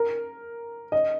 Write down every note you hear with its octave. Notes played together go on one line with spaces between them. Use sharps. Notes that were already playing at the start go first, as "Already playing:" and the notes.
Already playing: A#4
D#5